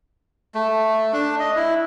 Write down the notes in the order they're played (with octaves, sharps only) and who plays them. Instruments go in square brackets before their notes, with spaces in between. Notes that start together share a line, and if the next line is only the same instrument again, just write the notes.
[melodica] A3
D4
D#5
E4